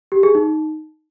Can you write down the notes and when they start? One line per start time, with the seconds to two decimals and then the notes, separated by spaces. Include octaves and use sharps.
0.12 G4
0.23 G#4
0.35 D#4